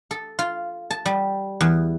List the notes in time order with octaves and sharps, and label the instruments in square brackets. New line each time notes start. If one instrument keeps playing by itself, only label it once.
[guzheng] A4
F4
A5
G3
E2